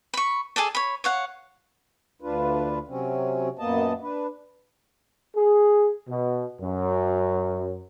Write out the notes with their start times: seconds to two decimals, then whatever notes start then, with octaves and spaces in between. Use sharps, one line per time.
0.14 B5 C#6
0.56 G#4 A4 D5 A5
0.75 C#5 B5
1.04 C#5 F5 F#5
2.21 D2 D4 F4 B4
2.88 C3 F#3 C4 C#4
3.59 F#2 A#2 A#3 B3 D#5 A5
4.01 D4 B4
5.36 G#4
6.08 B2
6.61 F#2